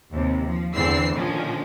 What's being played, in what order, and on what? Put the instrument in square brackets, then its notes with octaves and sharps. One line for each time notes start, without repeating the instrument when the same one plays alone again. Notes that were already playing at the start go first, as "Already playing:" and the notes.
[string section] D#2 C3
F3
E2 D3 E3 C4 E6 C7
A#2 D3 D#3 F3 G#3 C#4